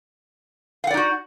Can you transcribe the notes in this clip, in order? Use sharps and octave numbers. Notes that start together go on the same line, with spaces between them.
D#4 F#4 D5 F5 F#5